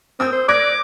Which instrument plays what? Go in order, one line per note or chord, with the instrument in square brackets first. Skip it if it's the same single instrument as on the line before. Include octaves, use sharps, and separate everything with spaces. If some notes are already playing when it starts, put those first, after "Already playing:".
[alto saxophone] C4 [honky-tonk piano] D#6 E6 G6
[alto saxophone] C5
[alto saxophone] D5 [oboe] D6 [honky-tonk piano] F#6 G#6 A#6